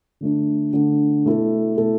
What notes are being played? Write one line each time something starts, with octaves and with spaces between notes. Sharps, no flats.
D3 A3 D4
D3 A3 D4
B2 A3 E4 A4
B2 A3 E4 A4